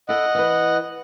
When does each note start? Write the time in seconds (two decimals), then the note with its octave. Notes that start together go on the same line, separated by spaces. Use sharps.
0.09 E4 A4 D#5 F#5
0.35 E3 B4